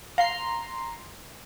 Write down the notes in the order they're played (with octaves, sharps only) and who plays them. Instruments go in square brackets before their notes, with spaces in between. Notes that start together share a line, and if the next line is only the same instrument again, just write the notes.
[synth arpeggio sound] F5 [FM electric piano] A#5 C6 C7